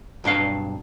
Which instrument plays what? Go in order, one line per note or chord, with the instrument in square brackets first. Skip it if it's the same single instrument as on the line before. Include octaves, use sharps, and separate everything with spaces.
[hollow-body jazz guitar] B1 G2 D4 F5